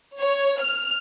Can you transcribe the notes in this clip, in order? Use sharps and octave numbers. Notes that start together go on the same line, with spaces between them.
C#5
F6